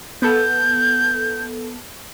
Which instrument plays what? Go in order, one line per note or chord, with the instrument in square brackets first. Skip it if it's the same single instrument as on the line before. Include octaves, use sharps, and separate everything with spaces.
[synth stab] B3 A4 [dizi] G6